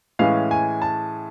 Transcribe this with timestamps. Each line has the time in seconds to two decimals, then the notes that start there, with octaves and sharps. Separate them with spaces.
0.19 A2 E3 G#3 C#4 F5
0.51 G#5
0.82 A5